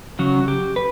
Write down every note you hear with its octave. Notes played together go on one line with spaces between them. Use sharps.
C#3 F#3 C#4 F#4
G4
B4